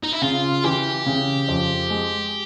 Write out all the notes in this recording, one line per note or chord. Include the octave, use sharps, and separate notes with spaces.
D#4
E4
C#3 F4
E3 G4
C#3
F2
G#3